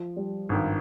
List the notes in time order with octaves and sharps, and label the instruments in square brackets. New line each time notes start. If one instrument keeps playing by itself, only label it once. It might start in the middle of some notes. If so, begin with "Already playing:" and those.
Already playing: [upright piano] F3
G3
[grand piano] G#1 G2 D#3